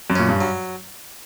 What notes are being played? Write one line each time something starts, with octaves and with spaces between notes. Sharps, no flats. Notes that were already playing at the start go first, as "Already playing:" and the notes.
F#2
A#2 C#4
G2
F#3